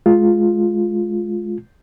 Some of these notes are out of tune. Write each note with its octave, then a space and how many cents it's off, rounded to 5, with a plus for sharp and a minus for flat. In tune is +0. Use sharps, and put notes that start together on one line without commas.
G#3 +20 F4 +0